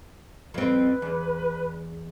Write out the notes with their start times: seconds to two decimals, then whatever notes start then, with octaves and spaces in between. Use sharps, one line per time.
0.54 F2 C4 B4
1.02 E2